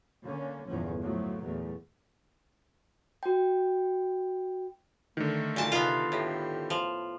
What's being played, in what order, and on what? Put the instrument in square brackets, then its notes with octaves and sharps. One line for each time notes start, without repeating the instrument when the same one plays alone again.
[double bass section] D3 A#3 C#4
G1 E2 A#2 F3 C#4
A2 F3 F#3 A3
E2 A#2 A3
[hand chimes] F#4 G5
[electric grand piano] D3 D#3 [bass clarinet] A3
[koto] A#2 A5
[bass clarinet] C3 [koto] B3 F4
[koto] A2 [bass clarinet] G4
[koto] F3